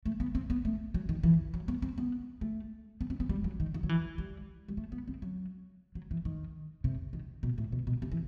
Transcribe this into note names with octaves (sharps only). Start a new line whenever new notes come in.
A3
B3
C4
B3
A3
F#3
D#3
E3
F#3
B3
C4
B3
A3
B3
C4
B3
G3
F#3
D#3
D#3
F#3
E3
G3
G3
A3
B3
C4
F#3
F#3
E3
D#3
C3
D#3
B2
A2
B2
B2
C3
E3